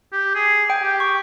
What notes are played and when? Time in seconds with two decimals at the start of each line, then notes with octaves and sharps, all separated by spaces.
0.12 G4
0.35 G#4
0.70 G5
0.82 G4
1.00 C#6